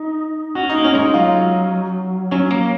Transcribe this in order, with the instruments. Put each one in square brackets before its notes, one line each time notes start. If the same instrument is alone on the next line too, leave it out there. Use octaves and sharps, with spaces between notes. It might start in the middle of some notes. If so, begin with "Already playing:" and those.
Already playing: [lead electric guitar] D#4
[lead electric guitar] C#4 [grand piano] F#4
[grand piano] D#4
[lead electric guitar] A#3
[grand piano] C#4
[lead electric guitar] G#3 [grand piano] D#4
[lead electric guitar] F#3 [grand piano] F4
[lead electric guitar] F#3 [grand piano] C#4
[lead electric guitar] A#3